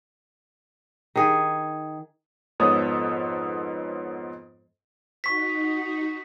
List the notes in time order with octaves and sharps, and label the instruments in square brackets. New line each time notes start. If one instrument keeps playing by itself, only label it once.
[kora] D#3 G#4
[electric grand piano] F2 G#2 B3 A4 C#5 D#6
[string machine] D#4 F#4 [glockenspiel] C#6 B6